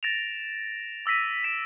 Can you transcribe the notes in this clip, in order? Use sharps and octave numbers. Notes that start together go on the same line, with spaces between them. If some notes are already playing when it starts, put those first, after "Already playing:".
A6 A#6 D7 E7 F7
D6 E6 A#6 B6 D#7
B6 D7 E7